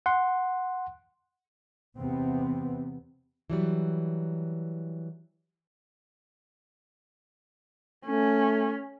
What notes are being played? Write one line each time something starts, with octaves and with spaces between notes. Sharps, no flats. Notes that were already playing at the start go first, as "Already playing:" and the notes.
F#5 C6
E2 C3 B3 C4
E3 F#3 G3
A3 C#4